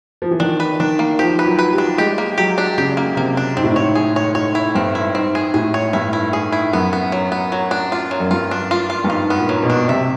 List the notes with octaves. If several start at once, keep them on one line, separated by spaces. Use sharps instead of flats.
F3
E3
D#3 D4
B4
D#3 D4
A#3
F3 G4
B4
F#3
B4
G3
D4
G#3 G4
A#3
F#3 G4
D4
C#3 G4
A#3
C3 A#3
D4
G#2 C4
A2
G#2
C#5
G#4
C#5
G#2 C#5
E4
G2 C4
E4
G#2 C4
G#4
A2 G#4
C#5
G2 E4
E4
G#4
E4
F#2 B3
B3
F#3
B3
F#3
D4
F4
F#3
F#2
G2 F4
D4
F4
F4
G2
G#2 F4
B3
A#2
F#3
B2
D4
C3 E5